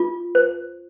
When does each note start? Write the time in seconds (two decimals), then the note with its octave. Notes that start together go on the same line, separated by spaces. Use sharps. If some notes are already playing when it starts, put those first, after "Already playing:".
Already playing: F4
0.35 C5